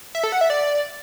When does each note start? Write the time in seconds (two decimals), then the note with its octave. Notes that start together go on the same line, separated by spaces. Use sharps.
0.15 E5
0.23 A4
0.32 F#5
0.41 E5
0.50 D5